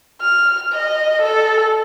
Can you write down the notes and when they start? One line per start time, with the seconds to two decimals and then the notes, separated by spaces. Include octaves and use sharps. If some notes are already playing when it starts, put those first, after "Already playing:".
0.21 F6
0.72 D#5
1.21 A4